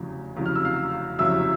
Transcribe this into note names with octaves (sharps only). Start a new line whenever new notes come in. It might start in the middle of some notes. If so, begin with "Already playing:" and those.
Already playing: F1 E2 C#3 F#3
F1 E2 C#3 F#3
F6
E6
F5 F6
F1 E2 C#3 F#3 E5 E6